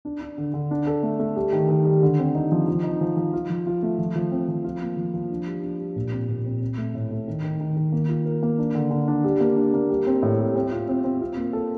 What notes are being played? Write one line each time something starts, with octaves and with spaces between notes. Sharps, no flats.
D4
D4
D3
D3
D4
A4
A3
A3
G3
D#3
D#3
G3
D3
C4
D#4
F3
F3
D#4
F3
F3
F4
F3
F4
A3
F3
F3
C4
F3
F4
A#3
F3
F3
D4
G3
D4
G3
A#2
C4
A#2
C4
C4
A3
A2
A3
D#3
D#3
D#3
D#3
A#3
F4
A#4
A#3
D4
D3
D3
D4
G3
A#3
D4
A#3
G3
C4
A2
G3
C4
F4
C4
C4
F4
A#3
A4